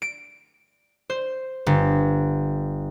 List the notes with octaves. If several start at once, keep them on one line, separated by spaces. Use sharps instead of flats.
D7
C5
G1